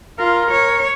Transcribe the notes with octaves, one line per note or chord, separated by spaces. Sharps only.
F4 A#4
C#5